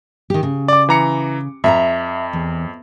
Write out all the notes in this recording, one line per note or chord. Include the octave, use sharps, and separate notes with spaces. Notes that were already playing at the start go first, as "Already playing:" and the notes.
D#3 G4
C#3
D5 D6
E3 A#5 C#7
F2 E5 G#5 A#5
E2